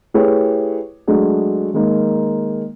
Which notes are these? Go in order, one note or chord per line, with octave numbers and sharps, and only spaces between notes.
A3 E4 G4 G#4 B4 C#5
F#3 G#3 A3 D4 G#4
D#3 G#3 A#3 D#4